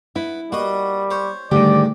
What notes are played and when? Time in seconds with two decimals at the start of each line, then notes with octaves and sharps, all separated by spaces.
0.16 B3 E4
0.52 G3 A#3 F#4 D#5
1.10 C5 C#5
1.51 D2 G#2 D3 D#3 G3 G4 D5